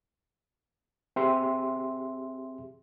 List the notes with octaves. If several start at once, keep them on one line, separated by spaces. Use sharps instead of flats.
C4 G4 G#4 E5 C6